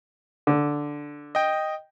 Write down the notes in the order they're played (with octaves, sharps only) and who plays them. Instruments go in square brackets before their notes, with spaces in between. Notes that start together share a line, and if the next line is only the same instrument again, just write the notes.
[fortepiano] D3
[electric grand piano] D#5 G5